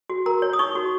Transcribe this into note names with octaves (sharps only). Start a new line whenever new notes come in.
F#4
A#4 A#5
C#5
D#6
D#4 C#6
F#4